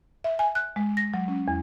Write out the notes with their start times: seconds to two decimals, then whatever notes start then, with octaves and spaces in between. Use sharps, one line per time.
0.24 E5
0.39 G#5
0.55 F#6
0.76 G#3
0.97 A#6
1.14 F#3
1.28 C#4
1.48 E2